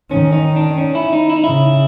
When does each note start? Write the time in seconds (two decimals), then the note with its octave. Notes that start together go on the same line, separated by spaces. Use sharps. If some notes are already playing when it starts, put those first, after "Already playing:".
0.11 D#3 C#4
0.33 D#4
0.56 D4
0.78 C#4
0.95 E4
1.13 D#4
1.29 E4
1.36 D#4
1.44 C#3 E4